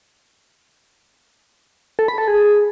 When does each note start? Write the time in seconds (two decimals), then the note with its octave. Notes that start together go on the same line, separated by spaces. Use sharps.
1.99 A4
2.08 B5
2.18 A4
2.28 G#4